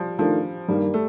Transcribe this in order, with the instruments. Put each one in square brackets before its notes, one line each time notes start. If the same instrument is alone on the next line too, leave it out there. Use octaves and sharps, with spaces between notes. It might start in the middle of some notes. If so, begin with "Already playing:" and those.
Already playing: [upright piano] F3 G3
[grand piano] D#3 A3 D4 F4 [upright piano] F3
[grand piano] G2 D#3 A#3 [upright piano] G3
[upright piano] A3